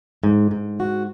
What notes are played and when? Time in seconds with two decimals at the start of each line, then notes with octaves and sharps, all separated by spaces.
0.23 G#2
0.51 G#2
0.80 F#4